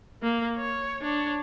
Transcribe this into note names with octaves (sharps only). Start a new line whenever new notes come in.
A#3
C#5
D4 C#5